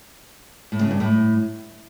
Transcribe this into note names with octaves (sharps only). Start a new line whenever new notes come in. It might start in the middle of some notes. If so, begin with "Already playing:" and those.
A2
C#3
G2
A2